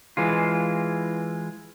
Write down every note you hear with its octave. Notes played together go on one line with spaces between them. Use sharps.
E3 G#3 F4